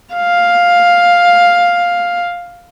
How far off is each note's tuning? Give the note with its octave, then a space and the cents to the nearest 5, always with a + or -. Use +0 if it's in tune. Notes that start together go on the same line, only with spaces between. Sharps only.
F5 +5